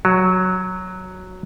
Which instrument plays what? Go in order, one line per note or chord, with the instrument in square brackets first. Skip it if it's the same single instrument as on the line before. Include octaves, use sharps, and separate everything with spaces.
[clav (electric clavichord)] F#3